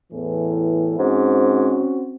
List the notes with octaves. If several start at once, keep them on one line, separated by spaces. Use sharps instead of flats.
E2 A2 E3
G#2 C4 C#4 F#4